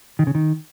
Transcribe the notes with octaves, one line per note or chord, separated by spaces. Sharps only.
D#3
C#3
D#3